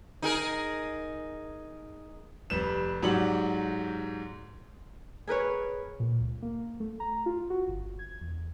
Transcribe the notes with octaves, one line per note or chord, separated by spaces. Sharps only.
D#4 G#4 A#4
F1 G3 B4 E7
G#2 F#3 G4 D5 F#5 F#7
G#4 A#4 B4 C#5
A#2
C#2
A#3
A3
A#5
F4
F#4
G1
G#6
E2